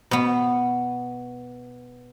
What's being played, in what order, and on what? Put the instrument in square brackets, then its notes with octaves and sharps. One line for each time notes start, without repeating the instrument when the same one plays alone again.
[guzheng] B2 B3